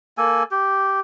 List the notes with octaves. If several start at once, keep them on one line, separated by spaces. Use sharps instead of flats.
A#3 A4 G#5
G4